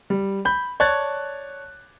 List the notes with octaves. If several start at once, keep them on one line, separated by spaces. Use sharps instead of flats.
G3
B5 G6
C#5 D5 A5 F#6 G#6 A6